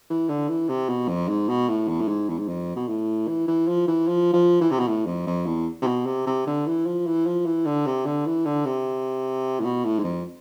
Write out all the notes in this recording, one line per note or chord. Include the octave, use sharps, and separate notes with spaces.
E3
D3
E3
C3
B2
F2
G#2
B2
A2
E2
A2
G#2
E2
G#2
F2
B2
A2
E3
E3
F3
E3
F3
F3
E3
C3
B2
A2
F2
F2
E2
C3
B2
C3
C3
D3
E3
F3
E3
F3
E3
D3
C3
D3
E3
D3
C3
A2
B2
A2
G#2
F2